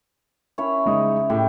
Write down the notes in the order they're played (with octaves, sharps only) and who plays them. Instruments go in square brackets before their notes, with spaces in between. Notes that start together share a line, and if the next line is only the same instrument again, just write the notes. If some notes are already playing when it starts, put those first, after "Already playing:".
[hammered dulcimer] C#4 E4 C#5
[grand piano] C#3 G#3 D#4
[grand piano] A2 [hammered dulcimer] G4